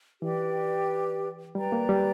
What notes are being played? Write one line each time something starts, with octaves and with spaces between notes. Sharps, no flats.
E3 G4 B4 D5 G5
G3 B4 D5 G5 A#5
A#3
G3